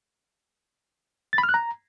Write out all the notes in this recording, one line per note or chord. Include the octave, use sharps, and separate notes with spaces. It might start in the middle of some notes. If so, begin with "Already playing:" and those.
A6
B5
F6
F#6
A#5